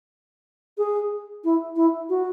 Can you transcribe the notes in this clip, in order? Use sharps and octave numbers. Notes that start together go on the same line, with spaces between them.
G#4
E4
E4
F#4